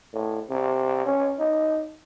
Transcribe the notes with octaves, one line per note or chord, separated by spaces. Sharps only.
A2
C3
C#4
D#4